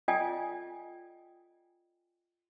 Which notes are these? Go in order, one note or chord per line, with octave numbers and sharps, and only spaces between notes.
F4 A4 D5 D#5 G5 G#5